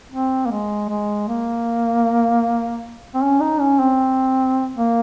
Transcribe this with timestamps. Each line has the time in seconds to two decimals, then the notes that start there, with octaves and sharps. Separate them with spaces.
0.12 C4
0.46 A#3
0.51 G#3
0.89 G#3
1.28 A#3
3.15 C4
3.22 C#4
3.40 D#4
3.60 C#4
3.79 C4
4.76 A#3